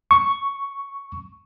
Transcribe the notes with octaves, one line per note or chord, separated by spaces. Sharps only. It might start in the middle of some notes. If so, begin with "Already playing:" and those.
C#6